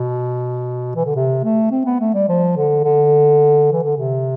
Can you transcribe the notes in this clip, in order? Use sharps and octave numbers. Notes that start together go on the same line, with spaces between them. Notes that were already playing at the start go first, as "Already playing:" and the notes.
Already playing: B2
E3
D3
C3
A3
C4
B3
A3
G3
F3
D3
D3
E3
D3
C3